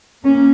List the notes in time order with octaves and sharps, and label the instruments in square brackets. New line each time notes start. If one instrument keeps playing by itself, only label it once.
[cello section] A#3 C#4